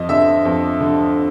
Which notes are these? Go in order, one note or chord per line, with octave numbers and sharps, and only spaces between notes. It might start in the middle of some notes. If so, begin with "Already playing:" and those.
Already playing: F2 D#5
D3 E5
F2
D3